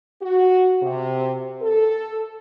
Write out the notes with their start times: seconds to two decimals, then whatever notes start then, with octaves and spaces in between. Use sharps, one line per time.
0.21 F#4
0.81 C3
1.61 A4